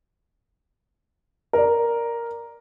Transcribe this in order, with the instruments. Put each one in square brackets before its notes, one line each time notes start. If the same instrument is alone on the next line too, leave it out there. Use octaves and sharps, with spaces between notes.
[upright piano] A#4 D5